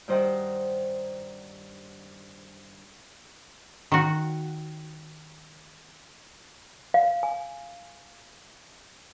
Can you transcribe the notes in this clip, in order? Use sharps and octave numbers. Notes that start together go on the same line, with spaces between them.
G2 D#3 C5 D#5 F#5 G5
D#3 F#4
F5
G#5